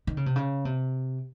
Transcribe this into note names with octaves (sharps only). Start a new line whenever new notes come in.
D#3
C#3
C3
C#3
C3